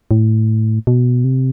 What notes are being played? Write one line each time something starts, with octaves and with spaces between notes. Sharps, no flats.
A2
B2
C3